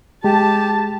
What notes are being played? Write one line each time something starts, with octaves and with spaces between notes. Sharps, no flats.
G#3 G4 A5